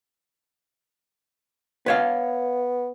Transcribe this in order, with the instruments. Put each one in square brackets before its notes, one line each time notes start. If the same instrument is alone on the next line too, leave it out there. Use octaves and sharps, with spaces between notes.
[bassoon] B3 [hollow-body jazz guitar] B4 C#5 F5